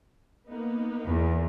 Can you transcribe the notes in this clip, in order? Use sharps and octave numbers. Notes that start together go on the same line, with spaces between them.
A#3 B3 D#4
E2